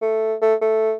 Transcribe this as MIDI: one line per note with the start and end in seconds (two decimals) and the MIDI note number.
0.02 0.35 57
0.42 0.55 57
0.61 0.94 57